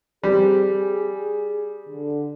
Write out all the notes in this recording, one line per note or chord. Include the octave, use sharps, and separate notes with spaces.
G3 C4 G4 G#4
G#4
D3